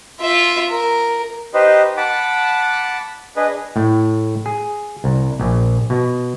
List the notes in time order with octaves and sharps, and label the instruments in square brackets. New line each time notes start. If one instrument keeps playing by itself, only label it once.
[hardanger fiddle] F4 E5
A#4
[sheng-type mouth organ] D#4 G4 B4 C5 D#5
F#5 A5 B5 D6
D4 G#4 B4 D#5
[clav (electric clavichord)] A2
G#4
C2
A#1
B2